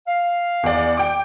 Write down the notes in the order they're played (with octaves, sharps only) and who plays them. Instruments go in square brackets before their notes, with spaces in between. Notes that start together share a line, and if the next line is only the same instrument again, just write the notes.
[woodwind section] F5
[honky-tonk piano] E2 D5
G5 D6